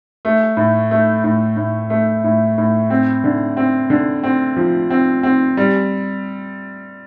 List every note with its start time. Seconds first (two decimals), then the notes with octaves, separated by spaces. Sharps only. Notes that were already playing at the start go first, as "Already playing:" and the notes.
0.25 A3
0.57 A2
0.91 A3
1.24 A2
1.57 A2
1.90 A3
2.24 A2
2.58 A2
2.90 C4
3.24 D3
3.57 C4
3.90 D3
4.23 C4
4.56 F3
4.90 C4
5.23 C4
5.57 G3